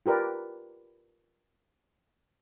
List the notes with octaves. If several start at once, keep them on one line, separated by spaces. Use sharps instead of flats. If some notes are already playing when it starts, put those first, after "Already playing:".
F4 G4 A#4 B4 D5